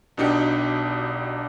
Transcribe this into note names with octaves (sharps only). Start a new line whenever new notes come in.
B1 B2 D4 D#4 G4 C#7